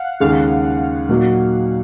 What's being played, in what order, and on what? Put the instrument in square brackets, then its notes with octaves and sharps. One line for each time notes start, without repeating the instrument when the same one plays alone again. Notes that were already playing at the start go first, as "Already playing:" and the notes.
Already playing: [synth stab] F5 F#5
[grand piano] D#2 C#3 G#3 [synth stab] F5
[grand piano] A#2 F#3 A#3 D#4 F#4